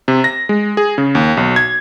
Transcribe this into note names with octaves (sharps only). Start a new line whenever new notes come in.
C3
A#6
G#3
G#4
C#3
D#2
B1
G#6